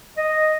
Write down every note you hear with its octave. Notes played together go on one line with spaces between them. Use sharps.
D#5